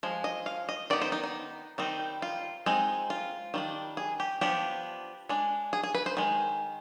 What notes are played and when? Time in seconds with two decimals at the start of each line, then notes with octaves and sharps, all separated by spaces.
0.03 F3 G#3
0.24 D#5
0.46 F5
0.69 D#5
0.90 D#3 B3 D#4 D5
1.02 C5
1.12 D#4
1.23 D#4
1.78 D#3 G3 C4 D#4
2.22 F4
2.66 G#3 C4 D#4
3.10 F4
3.54 D#3 G3 D4
3.97 G#4
4.20 G4
4.41 F3 B3 D4 G4
5.29 G#3 D4
5.73 G#4
5.83 G#4
5.94 B4
6.06 C5
6.17 D#3 G#3